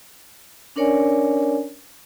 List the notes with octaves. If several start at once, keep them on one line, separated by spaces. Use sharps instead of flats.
C#4 D4 A#4 C#5 D5 G#5